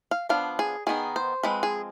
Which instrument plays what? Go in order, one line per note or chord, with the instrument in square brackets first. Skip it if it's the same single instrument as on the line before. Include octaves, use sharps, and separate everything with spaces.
[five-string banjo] F5
F3 B3 D4 F5
G#4
D#3 B3 D#4 G#4
C5
F3 G#3 C4 B4
G#4